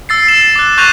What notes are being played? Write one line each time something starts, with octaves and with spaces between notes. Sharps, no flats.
E6 A6 C7
E7
D6 F#6
C#6 F#6 G6 A#6 D#7 F7